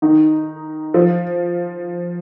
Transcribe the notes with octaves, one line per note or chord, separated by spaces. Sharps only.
D#3 D#4
F3 F4